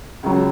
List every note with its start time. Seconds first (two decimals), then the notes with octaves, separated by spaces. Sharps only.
0.23 C#2 C#3 F#3